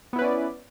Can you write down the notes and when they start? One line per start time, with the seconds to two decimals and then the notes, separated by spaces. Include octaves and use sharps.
0.13 B3
0.16 E4
0.19 B4
0.22 C#4
0.24 D5